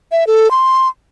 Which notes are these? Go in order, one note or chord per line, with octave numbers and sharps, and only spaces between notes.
E5
A4
C6